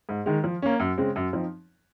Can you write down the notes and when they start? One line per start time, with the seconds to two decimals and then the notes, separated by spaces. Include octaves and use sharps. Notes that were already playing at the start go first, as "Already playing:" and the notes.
0.09 G#2
0.26 D#3 G#3
0.44 F3
0.62 A#3 C#4
0.80 F#2
0.98 C#3 G#3 C4
1.16 F#2
1.33 F3 C4 D#4